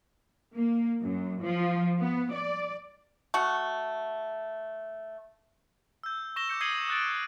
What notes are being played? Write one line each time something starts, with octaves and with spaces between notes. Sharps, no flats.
A#3
F#2
F3
B3
D5
A3 F#4
E6 G6
C#6 A#6 E7 G7
D6 G6 C#7 E7
D#6 G#6 C7 D#7 F#7 G7
D#6 F#6 A6 D7